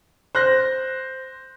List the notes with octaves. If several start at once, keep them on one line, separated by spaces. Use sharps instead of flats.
C5 F#6 A#6